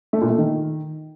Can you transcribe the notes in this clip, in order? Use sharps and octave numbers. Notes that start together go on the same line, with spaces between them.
A3
A#2
A3
D#3